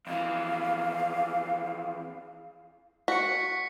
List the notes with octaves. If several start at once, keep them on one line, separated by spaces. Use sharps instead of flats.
F2 E3 F5
F#4 B6 C#7